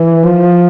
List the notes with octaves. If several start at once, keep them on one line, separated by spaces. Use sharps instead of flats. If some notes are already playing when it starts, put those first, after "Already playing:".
Already playing: E3
F3